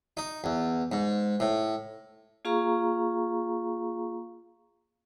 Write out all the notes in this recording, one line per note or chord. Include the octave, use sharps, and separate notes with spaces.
D#4
E2
G#2
A2
A#3 F4 G#4 F5 A#5 C#6